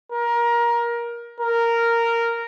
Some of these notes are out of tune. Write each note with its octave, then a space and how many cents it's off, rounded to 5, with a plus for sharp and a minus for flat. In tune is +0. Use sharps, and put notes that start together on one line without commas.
A#4 +20
A#4 -10